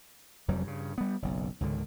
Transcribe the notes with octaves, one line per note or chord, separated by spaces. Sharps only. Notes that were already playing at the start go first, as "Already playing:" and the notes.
F1 F2 F#3 G3
G2 C#3
G3 B3
F#1 B1
C#2 G#2 D3 D#3